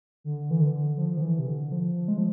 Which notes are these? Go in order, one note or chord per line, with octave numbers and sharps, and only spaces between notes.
D3
E3
D3
F3
D3
E3
C3
D3
F3
G#3
F3